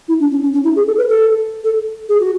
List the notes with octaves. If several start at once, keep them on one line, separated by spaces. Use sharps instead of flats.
E4
D4
C#4
C#4
C#4
E4
G#4
A4
B4
A4
A4
G#4
F#4